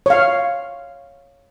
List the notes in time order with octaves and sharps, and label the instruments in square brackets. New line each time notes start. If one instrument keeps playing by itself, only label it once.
[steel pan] C#5 F5